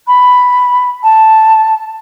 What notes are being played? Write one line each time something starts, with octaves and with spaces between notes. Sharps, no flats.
B5
A5